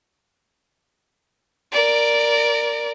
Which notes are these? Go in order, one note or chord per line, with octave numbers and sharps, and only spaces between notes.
A#4 D5